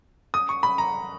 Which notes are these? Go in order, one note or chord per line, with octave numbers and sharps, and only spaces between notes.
D#6
C#6
B5
A#5